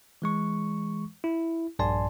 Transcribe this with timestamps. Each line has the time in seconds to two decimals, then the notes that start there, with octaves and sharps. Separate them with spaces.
0.22 E3 G#3 C#6
1.24 E4
1.79 A#1 G2 D5 G#5 A5 C6